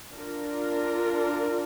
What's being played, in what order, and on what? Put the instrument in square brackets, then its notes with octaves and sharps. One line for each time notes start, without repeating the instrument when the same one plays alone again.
[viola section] D4 F4 A#4